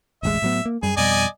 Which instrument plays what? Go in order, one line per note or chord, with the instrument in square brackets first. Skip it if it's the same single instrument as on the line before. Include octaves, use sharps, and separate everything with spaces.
[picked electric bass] E1 A1 G#3 [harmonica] E5
[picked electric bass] A2 F#3 B3
A#3
[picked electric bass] F#2 G3 [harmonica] G#4
[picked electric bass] F2 B2 G3 [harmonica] D5 D#5 G#5